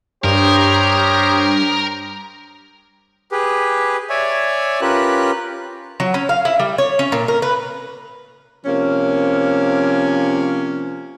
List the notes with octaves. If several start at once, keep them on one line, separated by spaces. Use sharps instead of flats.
G2 G4 A#4 C5 C#5 D#6
G4 G#4 B4
C#5 D5 E5 G#5
C#4 F4 G4 A#4 B4 F#6
F#3
C#4
F5
E4
G3
C#5
C#4
A#2
A#4
B4
C3 F3 A#3 C#4